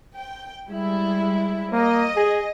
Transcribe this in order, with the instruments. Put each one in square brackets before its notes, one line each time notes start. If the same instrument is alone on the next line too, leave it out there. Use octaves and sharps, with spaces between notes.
[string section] G5
G3 G#3 E4
[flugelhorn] A#3 [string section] D#5
[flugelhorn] G#4